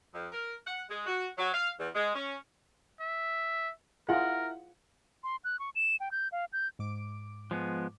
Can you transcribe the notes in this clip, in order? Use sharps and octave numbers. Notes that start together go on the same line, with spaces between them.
F2
A#4
F#5
G#3
F#4
F#3
F5
E2
G#3
C#4
E5
E4 F4 G#4 A#4 F#5
C6
F#6
C#6
E7
G5
G6
F5
G6
G#2 D6 D7
F3 G#3 B3